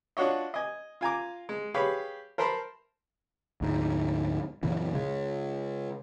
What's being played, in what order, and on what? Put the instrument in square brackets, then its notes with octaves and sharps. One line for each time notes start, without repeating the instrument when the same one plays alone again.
[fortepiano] D4 F4 F#4 C#5 D#5
D#5 G#5
F4 G#5 A#5 D6
G#3
G4 G#4 B4 C#5 F5 B5
A#4 C5 A5 B5 C6
[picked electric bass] D2 G#2
F#2 A#2 C#3 E3
C#3 G#3